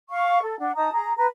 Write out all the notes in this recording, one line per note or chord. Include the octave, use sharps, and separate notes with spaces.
F5 C#6
A4
D4 F#5
D#4 A5 A#5 D#6
G#4 A#5
B4 A#5